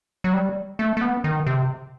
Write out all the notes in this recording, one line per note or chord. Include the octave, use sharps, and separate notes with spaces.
F#3
G3
A3
A3
B3
D#3
C3